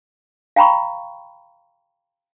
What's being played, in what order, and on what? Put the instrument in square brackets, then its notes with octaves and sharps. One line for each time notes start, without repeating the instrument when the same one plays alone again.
[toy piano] F5 G5 A#5 B5 C#6